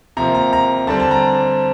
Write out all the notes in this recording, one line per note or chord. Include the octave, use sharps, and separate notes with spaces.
C3 F3 A#3 A#5
A#5
A#5
D3 G3 C4 A5
A5
A#5